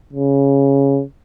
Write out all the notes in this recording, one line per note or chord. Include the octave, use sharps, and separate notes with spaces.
C#3